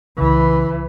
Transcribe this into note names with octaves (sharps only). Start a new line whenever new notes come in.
C2 C#3 E3